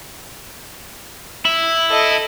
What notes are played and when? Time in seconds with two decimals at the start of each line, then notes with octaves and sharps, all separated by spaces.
1.45 E4
1.90 A4 D#5